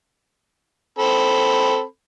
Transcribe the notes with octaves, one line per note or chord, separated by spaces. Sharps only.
C4 A4 B5